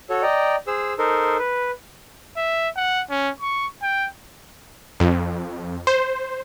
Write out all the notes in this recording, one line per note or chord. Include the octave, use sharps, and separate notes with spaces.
F#4 A4 C#5
D5 D#5 G5 A#5
G#4 C5 E6
D#4 A4 A#4 C5
B4
E5
F#5
C#4
C#6
G5
F2
C5